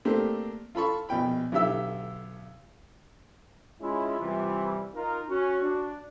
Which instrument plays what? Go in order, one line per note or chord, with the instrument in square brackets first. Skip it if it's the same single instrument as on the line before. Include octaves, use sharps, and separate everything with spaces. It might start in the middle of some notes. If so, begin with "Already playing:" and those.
[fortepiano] A3 A#3 C4 D4 G4 C5
F4 A4 B5 C#6
A#1 B2 G5 B5
B1 D3 G4 E5 E6
[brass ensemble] G#3 C#4 E4 [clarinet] F4
[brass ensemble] C3 E3 G3
D#4 F4 A#4
[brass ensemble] C#4 [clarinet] F#4
[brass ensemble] D4